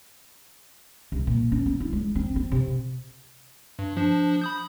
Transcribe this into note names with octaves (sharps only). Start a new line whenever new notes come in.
C2
A#2
C#4
B3
E4
G#3
C4
C4
C3
G2
F3 D4
B5 D#6 G6